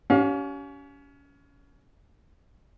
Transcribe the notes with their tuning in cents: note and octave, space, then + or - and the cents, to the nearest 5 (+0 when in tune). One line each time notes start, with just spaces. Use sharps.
C#4 +25 G4 -30 F5 +30